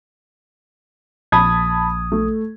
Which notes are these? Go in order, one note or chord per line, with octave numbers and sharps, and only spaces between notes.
A#1 A5 B5 D#6 G#6
A3